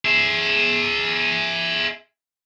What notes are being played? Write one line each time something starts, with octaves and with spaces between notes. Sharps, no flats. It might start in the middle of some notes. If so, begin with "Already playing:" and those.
G#4 E5